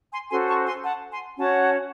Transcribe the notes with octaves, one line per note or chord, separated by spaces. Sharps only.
G#5 C6
C#4 F#4 A4 C5 G#5 C6
A5 C#6
G#5 C6
F#5 A5
G#5 C6
C#4 F#4 C#5 F#5 A5